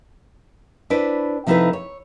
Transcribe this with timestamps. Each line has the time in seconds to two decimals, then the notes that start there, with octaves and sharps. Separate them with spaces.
0.90 D4 E4 B4 C5 D5
1.47 C3 F3 D#4 E4 A4 B4
1.73 C#5